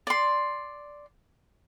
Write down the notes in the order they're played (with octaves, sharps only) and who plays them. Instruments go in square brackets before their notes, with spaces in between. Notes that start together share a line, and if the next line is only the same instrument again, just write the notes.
[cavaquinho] D5 C6